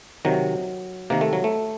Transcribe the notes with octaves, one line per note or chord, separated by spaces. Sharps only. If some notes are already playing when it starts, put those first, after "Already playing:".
C3 D#3 F#3
C3 D#3 A#3
A3
F#3
A3